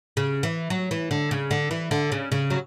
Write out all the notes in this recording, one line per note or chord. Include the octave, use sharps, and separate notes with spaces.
C#3
E3
F#3
E3
D3
C#3
D3
E3
D3
C#3
C#3
F#3